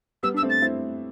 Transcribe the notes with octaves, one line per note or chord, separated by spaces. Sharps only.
G3 B3 E6
D4 E6
A3 C4
A6
C4 E4